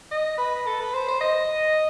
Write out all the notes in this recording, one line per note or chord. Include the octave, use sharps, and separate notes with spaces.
D#5
B4
A4
B4
C5
C5
D#5